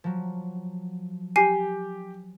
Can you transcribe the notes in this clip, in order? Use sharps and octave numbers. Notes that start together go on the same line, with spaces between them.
F3 F#3
G4 G#5 C7